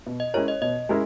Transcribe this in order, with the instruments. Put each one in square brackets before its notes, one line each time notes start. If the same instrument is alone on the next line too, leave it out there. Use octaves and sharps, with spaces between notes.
[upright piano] B2
[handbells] D#5
[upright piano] G#3 C#4 E4 A#4 [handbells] C#5
[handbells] D#5
[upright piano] B2 [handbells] D#5
[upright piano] G#3 C#4 E4 A#4